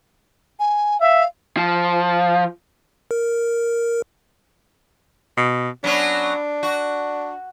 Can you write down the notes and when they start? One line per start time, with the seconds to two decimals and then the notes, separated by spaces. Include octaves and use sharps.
0.60 G#5
1.01 E5 F5
1.57 F3
3.11 A#4
5.37 B2
5.84 F#3 B3 C#4 D4
6.63 F#4